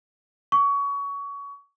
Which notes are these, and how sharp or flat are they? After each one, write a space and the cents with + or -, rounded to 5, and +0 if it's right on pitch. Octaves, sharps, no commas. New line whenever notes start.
C#6 +25